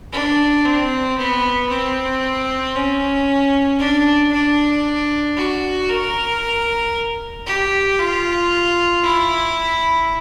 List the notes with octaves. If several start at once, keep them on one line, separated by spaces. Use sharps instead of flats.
D4
C4
B3
C4
C#4
D4
D4
F#4
A#4
G4
F4
E4